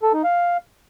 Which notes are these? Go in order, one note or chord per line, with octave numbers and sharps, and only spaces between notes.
A4
D#4
F5